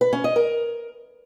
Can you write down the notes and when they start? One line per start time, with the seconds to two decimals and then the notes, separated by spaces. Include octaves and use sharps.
0.01 B4
0.13 C#4
0.24 D#5
0.36 A#4